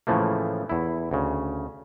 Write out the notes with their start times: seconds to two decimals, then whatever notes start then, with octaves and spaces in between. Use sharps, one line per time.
0.07 A2 C#3 E3 F3 A3 A#3
0.69 E2 E4
1.11 D2 C#3